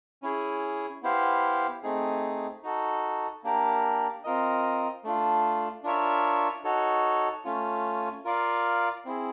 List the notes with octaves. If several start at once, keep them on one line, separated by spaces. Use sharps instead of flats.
C#4 E4 G#4
B3 E4 G4 C5 F5
A3 C4 D#4 G#4
D#4 F#4 A4
A#3 D4 G4 A#4
C4 F4 A#4 D#5
A3 D4 F4
D4 F4 A#4 C#5 E5
D#4 F#4 A4 C#5
A3 C#4 F4
F4 A#4 D5 F5
C4 E4 G#4